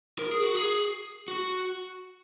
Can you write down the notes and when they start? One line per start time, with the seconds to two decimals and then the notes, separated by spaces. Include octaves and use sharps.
0.19 A#4
0.31 G#4
0.43 F#4
0.55 G#4
1.28 F#4